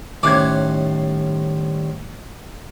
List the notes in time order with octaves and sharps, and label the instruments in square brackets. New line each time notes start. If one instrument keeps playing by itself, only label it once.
[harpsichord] A2 C#4 [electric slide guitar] D#3 G3 C5 [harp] D6 F#6 G#6